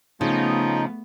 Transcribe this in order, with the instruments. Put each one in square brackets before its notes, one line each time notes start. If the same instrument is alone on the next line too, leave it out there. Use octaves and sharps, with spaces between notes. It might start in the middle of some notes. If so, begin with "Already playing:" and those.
[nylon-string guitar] C#3 [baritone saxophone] F3 [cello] A3 B3 [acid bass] D#4